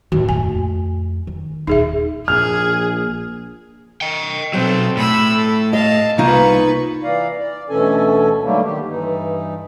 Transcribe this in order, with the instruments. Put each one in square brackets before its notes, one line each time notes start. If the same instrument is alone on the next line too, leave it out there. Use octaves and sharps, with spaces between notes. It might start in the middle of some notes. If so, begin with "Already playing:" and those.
[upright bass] D#2 A2 [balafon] F#4
[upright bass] F2 A3 [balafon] G#5
[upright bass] D#3
[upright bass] D#1 C#3 [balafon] D#4 G#4 E5
[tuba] A#1 [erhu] G#4 [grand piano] F6
[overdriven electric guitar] D#5 G5
[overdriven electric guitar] B2 F#3 [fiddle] C4 A4 [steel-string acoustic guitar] G5
[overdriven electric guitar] A2 [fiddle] B5 E6
[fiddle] A4
[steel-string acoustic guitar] D#5 [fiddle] F5 A5
[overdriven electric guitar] C2 [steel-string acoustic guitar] A#3 D#4 F4 [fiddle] B4 C#6
[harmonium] E3 D5 F5 A#5
D5
D2 B2 E3 C#4 A4 G#5
D3 D#3 F#3 G3 A3 A#3
D#3 G4
G2 E3 D#4